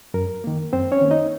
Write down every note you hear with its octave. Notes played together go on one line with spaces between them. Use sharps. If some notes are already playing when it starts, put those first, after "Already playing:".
F#2 A#4
D#3 A#3
F#2 C4 C5
C#4 C#5
D#3 A#3
D#4 D#5